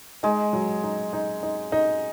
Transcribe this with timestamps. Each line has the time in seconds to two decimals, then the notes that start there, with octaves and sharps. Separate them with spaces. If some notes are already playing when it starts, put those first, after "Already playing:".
0.23 G#3 D#4
0.53 F#3
0.83 D#4
1.13 D#4
1.43 D#4
1.72 D#4